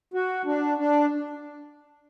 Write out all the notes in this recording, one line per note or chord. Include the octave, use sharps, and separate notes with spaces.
F#4
D4
D4